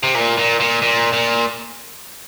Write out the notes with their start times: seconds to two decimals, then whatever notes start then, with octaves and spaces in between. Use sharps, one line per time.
0.03 C3
0.15 A#2
0.38 A#2
0.60 A#2
0.82 A#2
1.13 A#2